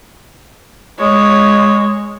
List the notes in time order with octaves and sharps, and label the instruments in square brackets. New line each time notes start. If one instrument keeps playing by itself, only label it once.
[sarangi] G#3 [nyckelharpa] C#5